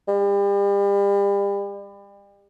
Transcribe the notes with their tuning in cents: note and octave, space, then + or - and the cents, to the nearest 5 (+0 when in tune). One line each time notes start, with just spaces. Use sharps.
G3 +35